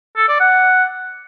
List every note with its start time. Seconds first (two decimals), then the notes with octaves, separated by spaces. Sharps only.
0.17 A4
0.28 D5
0.40 F#5